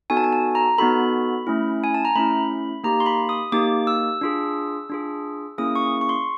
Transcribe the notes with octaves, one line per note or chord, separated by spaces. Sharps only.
B3 D#4 F#4 A4 G#5
A5
G#5
A5
A#5
B3 D#4 F#4 A4 B5
A3 C#4 E4
G#5
A5
A#5
A3 C#4 E4 B5
A#3 D#4 G4 A#5
C6
B5
D#6
A#3 D#4 G4 D6
E6
D4 F4 G#4
D4 F4 G#4
A#3 C#4 E4 G#4 D#6
C#6
C#6
C6